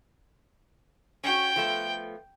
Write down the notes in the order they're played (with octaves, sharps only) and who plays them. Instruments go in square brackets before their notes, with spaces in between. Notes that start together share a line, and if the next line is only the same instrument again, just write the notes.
[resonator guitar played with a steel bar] C#4 F#4 [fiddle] G5
[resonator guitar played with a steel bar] F3 A3 B3